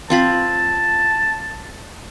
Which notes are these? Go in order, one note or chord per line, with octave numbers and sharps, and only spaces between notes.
C4 F4 A5 B5